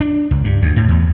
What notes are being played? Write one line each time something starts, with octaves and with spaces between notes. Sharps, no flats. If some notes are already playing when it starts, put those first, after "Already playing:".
D4
C#2
G2
D2
A2
E2